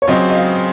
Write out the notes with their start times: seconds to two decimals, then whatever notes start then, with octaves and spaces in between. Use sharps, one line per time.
0.02 C#5
0.08 C#3 F#3 C4 F4 D#5
0.30 D#5
0.35 F5